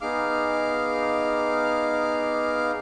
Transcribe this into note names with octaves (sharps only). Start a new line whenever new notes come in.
B3 D#4 G#4 F5 D6 F6